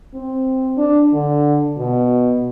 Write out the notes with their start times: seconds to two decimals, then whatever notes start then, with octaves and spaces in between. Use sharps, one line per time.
0.14 C4
0.77 D4
1.13 D3
1.77 B2